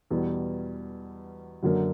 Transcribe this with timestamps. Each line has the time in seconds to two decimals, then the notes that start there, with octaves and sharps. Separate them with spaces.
0.10 E2 B2 G3
1.63 F#2 D3 F#3 A#3